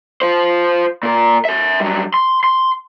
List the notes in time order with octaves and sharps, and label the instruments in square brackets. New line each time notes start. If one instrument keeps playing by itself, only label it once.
[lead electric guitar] F4 C5
A#2 A#4
A#4 E5
G2 F#3
C6
C6